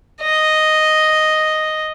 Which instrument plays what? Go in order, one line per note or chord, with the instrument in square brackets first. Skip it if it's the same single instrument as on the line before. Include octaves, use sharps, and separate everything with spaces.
[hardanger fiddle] D#5